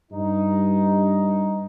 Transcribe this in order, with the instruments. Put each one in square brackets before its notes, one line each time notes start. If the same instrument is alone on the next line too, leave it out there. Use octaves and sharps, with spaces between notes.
[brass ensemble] G2 D#4